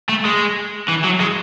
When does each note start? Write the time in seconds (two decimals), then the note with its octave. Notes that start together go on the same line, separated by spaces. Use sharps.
0.09 A3
0.25 G#3
0.89 E3
1.05 F#3
1.20 G#3